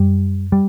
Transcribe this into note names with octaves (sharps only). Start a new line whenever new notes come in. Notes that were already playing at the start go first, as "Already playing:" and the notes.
Already playing: F#2 G3
G3